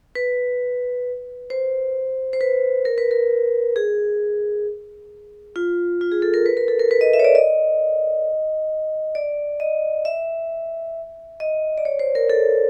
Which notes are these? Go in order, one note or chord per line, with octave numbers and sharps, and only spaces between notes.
B4
C5
C5
B4
A#4
B4
A#4
G#4
F4
F4
G#4
A4
A#4
B4
A#4
A4
A#4
B4
D#5
E5
C#5
D5
D#5
D5
D#5
E5
D#5
D5
C#5
C5
A#4
A4